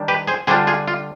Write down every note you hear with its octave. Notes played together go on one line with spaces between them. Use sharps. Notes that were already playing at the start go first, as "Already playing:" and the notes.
Already playing: D#3 G3 D4
G4 B4
G#4 C5
D3 G3 D4 F4 G#4 C5
F4 G#4
F4